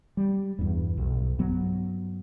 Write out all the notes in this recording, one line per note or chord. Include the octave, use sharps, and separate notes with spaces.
G3
E2 G2
B1
G2 F#3 B3